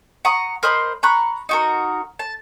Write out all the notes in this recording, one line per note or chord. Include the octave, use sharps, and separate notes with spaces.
F#5 A#5 C#6 D#6
A#4 C5 D#5 B5
A#5 B5 C#6 F#6
D#4 F#4 A#4
A5